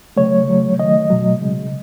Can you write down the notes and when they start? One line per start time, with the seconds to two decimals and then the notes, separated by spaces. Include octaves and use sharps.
0.17 C#3 F#3 A3 C#5
0.48 C#3 F#3 A3
0.79 D#3 F#3 A3 D#5
1.10 B2 F#3 A3
1.41 C#3 G#3